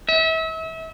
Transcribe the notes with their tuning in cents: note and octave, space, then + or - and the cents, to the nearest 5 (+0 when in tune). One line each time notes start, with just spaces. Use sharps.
E5 -35